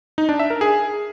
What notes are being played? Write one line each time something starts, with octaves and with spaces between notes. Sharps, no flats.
D#4
D4
E5
A#4
G#4